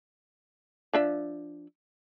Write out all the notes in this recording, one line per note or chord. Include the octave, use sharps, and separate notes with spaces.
F3 D4 E5